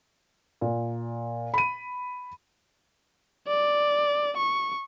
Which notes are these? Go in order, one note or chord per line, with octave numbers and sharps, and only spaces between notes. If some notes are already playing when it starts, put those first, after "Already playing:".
A#2
B5 D#7
D5
C#6